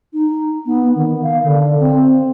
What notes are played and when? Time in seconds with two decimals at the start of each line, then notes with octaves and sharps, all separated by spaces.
0.13 D#4
0.65 B3
0.95 D#3
1.23 F5
1.43 D3
1.79 C4